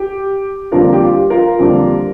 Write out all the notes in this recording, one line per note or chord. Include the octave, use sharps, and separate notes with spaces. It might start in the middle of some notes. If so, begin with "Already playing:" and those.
Already playing: G4
F2 D3 G3 A#3 D4 F4 A#4
G4
F4
F4 A#4
F2 D3 G3 A#3 D4